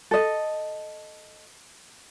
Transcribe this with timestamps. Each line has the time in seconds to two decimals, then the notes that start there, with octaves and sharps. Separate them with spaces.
0.11 A4 D#5